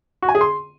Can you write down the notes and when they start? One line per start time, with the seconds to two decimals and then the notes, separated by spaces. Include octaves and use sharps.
0.22 F#4
0.29 G#5
0.35 G#4
0.41 C6